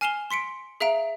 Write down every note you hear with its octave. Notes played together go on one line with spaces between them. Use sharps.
G#5 F6 C7 E7 F7 G7
C6 B6 C#7 D7
G#4 E5 F5 A#5 D7 F7